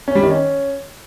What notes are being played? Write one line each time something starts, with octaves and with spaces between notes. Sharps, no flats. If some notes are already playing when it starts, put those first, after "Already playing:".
C#4
G3
D#3
C#4